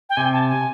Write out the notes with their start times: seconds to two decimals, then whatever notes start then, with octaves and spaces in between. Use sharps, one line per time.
0.10 G5
0.17 C3 G#5
0.33 A5
0.49 G#5